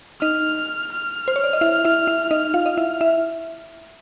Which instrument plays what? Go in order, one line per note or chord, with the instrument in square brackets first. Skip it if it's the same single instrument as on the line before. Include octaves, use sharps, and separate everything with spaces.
[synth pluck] D#4 D#5 [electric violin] F6
[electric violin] F6
[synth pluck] C5
C#5
D5
D#5
E4 E5
E4 E5
E4 E5
D#4 D#5
F4 F5
D#5
E4 E5
E4 E5